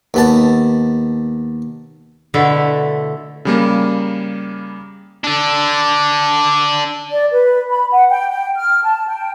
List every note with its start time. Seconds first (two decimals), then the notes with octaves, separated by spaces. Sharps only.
0.14 D#2 B3 A5
2.34 B2 D3 A3 E4 A#5
3.45 C#3 G3 A#3
5.24 D4 A4
7.11 D5
7.31 B4
7.70 B5
7.91 F#5
8.10 G5
8.29 G5
8.55 F6
8.83 A5
9.06 G5